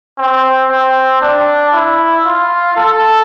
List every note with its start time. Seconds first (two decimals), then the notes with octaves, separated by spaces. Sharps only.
0.18 C4
0.70 C4
1.22 D4
1.73 E4
2.25 F4
2.77 A4